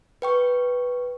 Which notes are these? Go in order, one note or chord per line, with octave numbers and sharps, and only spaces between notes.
B4 G5 C#6